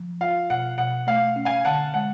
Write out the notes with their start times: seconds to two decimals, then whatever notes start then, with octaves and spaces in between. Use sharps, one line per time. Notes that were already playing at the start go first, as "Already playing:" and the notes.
Already playing: F3
0.21 F4 F5
0.50 B2 F#5
0.78 B2 F#5
1.07 A3 F5
1.36 C#4
1.45 F5 G#5
1.65 D3 F#5 A5
1.94 G#3 F#5